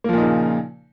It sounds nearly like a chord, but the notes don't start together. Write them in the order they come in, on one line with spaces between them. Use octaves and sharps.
A#3 F3 A#2 D#4 C#3